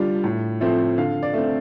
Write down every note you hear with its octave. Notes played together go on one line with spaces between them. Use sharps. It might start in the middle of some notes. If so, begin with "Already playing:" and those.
Already playing: D3 G3 D4 F4
A2
F3 A3 C4 F4
D3 F5
D5
A3 C4